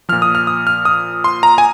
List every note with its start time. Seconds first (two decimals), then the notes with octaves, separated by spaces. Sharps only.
0.09 A#2 F3 F6
0.22 D#6
0.35 F6
0.47 D#6
0.67 F6
0.85 D#6
1.24 C6
1.43 A#5
1.58 G#5